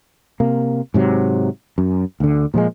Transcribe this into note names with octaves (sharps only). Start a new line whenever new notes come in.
C3 A#3
G#2 C3 F#3
F#2
D2 D3
A#2 F3 F#3 G#3